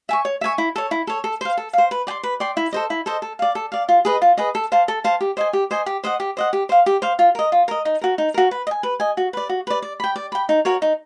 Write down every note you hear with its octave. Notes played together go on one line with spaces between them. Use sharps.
E5 G#5 C#6
C#5
E5 G#5 C#6
E4
A4 C#5
E4
A4 C#5
A4
C5 F5
A4
C5 F5
B4
D5 G5 C6
B4
D5 G5 C6
E4
A4 C5 D#5
E4
A4 C5 D#5
A4
D5 F5
A4
D5 F5
F4
G#4 B4 D#5
F4
G#4 B4 D#5
A4
C5 F5 A5
A4
C5 F5 A5
G4
C5 D#5 G#5
G4
C5 D#5 G#5
G4
C5 D#5 F#5
G4
C5 D#5 F#5
G4
C5 F5
G4
C5 F5
F4
A#4 D#5
F4
A#4 D#5
D#4
F#4 A#4
D#4
F#4 A#4
B4
D#5
G#5
B4
D#5 G#5
F#4
B4 D5
F#4
B4 D5
D5
G5 B5
D5
G5 B5
D#4
F#4 A#4 C#5
D#4